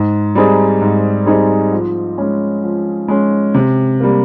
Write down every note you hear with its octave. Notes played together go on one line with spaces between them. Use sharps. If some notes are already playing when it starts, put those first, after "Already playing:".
Already playing: G#2
G3 C4 D#4 G#4
G#2
G3 C4 D#4 G#4
F3
G#3 C#4
F3
G#3 C#4
C3
G3 A#3